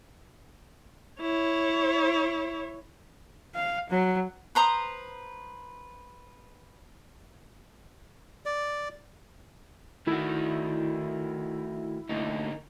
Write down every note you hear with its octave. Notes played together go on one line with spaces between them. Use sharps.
E4 C#5
F5
F#3
B4 C5 A#5 D#6
D5
D#3 A3 E4 F#4
D2 D3 A#3 D#4